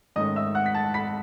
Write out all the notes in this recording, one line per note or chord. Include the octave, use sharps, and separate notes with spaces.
G#2 D#3 A3 C#4 D#5 D#6
E5 E6
F#5 F#6
B6
A5 A6
B5 B6